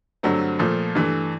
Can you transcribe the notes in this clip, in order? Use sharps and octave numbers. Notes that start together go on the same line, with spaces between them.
G2 D3 F#3 A3 C4
A#2 F3 A3
G2 E3 A3